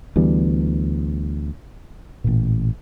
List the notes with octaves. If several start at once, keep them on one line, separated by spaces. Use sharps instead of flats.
D2 E3 G3 B3
A1 A#2